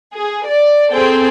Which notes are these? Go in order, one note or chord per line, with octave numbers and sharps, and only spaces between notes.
G#4
D5
C4 G#4 A4 G5